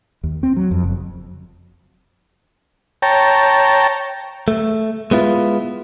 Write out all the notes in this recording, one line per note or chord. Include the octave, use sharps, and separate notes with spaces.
D#2
C4
F#3
F2
F#1
C#5 G5 A5 A#5
A3
G#3 B3 E4 F4